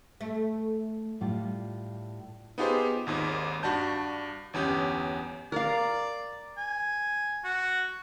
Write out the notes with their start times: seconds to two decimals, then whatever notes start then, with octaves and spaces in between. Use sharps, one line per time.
0.21 A3
1.21 A2 G3 F4
2.58 B3 D#4 F4 G4 G#4 C5
3.07 G#1 D#2 G#2
3.63 G2 F#4 D5 A5 G6
4.53 G1 E2 C#4 G4 G6
5.52 A#4 D5 F5
6.57 G#5
7.44 F#4